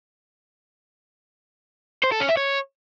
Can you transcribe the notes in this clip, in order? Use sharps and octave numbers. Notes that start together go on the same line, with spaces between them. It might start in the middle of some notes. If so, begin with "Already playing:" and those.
C5
A4
C#4
E5
C#5